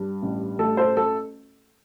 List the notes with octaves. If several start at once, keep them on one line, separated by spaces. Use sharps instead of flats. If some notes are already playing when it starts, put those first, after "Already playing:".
Already playing: G2
A1
A3 A4
A4 C5
A4